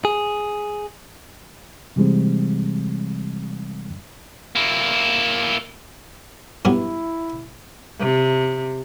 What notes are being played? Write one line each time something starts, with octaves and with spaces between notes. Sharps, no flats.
G#4
C3 E3 G3 G#3 C4
A#3 E4
G2 F#3 B3 E4
C3